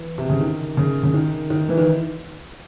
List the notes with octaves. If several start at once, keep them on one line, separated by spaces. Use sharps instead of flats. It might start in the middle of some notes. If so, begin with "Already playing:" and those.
Already playing: E3
C3
C#3
D#3
C#3
C#3
D#3
D#3
E3
D#3